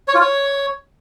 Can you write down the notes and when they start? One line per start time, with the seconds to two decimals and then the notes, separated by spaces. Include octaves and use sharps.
0.08 C#5
0.14 F4
0.21 C#5